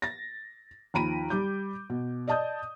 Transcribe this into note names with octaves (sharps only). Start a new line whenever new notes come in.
A6 A#6
D#2 F3 A#5 B5 D7 D#7
G3 D6 G6
B2
D5 D#5 A5 D#6 G6